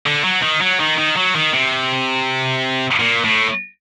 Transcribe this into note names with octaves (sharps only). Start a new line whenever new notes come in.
D3
F#3
D#3
F#3
D#3
D#3
F#3
D#3
C3
A#2
A2